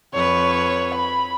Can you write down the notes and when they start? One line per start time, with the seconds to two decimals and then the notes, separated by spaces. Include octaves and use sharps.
0.14 F2 B4 C#5
0.95 B5